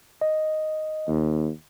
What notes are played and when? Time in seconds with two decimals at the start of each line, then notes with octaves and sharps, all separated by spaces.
0.21 D#5
1.08 D#2